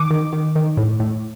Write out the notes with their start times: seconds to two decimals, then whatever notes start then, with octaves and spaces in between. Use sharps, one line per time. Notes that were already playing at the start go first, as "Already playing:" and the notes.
Already playing: D#3 D6
0.10 D#3
0.33 D#3
0.55 D#3
0.77 A2
1.00 A2